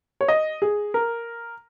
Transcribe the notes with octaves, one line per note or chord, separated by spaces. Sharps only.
C#5
D#5
G#4
A#4